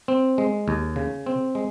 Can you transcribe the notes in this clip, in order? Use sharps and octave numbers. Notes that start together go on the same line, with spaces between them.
C4
G#3
D#2
C#3
C4
G#3